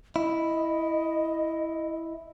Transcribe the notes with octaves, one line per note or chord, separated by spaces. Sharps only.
E4 D#5